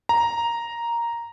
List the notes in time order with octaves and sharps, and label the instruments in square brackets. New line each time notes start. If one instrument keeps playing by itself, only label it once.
[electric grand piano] A#5